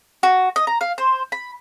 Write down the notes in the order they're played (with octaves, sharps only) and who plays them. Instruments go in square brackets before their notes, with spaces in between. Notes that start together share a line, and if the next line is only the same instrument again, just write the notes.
[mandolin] F#4
D#5
A#5
F5
C5
B5